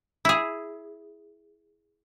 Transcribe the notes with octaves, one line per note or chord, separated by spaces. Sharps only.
E4 G#4